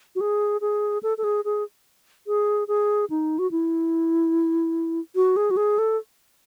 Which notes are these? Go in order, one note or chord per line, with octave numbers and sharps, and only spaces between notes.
F#4
G#4
G#4
A4
A4
G#4
G#4
G#4
G#4
D#4
F#4
E4
F#4
G#4
F#4
G#4
A4